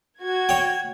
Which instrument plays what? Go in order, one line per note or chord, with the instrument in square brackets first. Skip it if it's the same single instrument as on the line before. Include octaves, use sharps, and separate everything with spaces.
[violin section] F#4 G#6
[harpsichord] C#5 G5